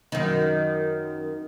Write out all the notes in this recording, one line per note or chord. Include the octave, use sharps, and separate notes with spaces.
F#2 D#3